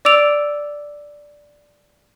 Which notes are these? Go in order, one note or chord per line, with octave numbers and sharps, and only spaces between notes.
D5 D6 E6 D7 F7